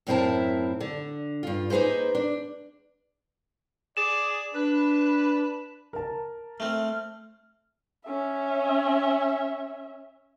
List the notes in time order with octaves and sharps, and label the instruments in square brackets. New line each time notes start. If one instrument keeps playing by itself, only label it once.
[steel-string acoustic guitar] F#2 A2 C4 E4 A#4 A5
D3
G2 F4
A#3 D#4 G#4 B4 C5
D4
[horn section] G#4 D5 [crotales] E7
[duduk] D4 [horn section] B4
[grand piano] A#4 A5
[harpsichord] A3 C4 [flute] F6
[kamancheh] C#4 E5